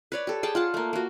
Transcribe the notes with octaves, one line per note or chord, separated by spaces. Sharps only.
B4 C#5 D5
G4 A4
G#4 G5 A5
F4 F#5 A5
A3 A#3
A#3 F#4